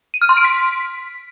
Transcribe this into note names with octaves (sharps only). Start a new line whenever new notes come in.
D#7
F6
C6
D7
B6